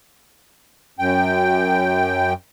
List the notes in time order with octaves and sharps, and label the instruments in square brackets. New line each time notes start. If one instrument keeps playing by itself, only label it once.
[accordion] F#2 G5